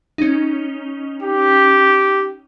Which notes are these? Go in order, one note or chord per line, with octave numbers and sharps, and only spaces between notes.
C#4 D#4
G4